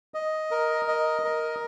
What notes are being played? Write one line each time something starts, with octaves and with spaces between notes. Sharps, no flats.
D#5
A#4
D#5
A#4